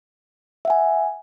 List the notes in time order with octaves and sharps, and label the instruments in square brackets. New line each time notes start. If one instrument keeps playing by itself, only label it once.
[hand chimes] E5
F#5
G#5